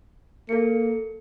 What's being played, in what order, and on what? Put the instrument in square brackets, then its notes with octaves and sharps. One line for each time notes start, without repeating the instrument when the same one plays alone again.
[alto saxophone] A#3 [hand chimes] A4 C#7